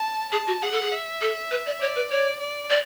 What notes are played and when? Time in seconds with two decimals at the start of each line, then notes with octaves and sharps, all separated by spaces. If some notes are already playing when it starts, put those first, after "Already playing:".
Already playing: A5
0.32 G#4 A5
0.47 F#4
0.62 G#4 F#5
0.72 A4
0.82 G#4
0.92 E5
1.21 A4
1.51 B4
1.66 D5
1.80 C#5 D5
1.96 B4
2.11 C#5 D5
2.40 D5
2.70 D5